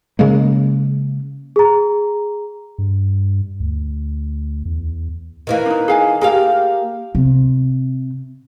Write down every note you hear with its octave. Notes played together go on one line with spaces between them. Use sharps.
C#3 G#3 A#3
G#4 A#5
G2
D2
E2
D#3 E3 A#3
D4 D#4
G#4 F5 G#5
A#3 G4 G#4 F5
C3